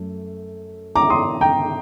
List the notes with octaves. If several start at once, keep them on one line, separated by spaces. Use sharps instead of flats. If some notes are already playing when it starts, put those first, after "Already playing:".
Already playing: F#2 A3
A#5 D6
C6 D#6
G5 A#5